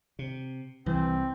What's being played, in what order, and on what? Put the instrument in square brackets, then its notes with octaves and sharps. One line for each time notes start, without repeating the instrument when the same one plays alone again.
[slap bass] C3
[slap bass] C2 [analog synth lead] E3 [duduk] C4